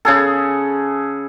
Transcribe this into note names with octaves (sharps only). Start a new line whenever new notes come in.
C#3 G#4 A4